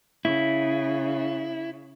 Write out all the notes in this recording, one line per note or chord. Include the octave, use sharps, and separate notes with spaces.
C#3 E4